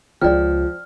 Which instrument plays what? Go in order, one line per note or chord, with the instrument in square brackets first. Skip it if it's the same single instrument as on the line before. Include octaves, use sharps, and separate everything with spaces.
[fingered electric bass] C#2 C#4 [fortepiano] F3 [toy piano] D5 G5 [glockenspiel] F6